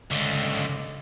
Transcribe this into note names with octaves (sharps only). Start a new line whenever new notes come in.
C#2 D3